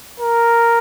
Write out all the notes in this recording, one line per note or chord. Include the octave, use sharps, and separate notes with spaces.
A#4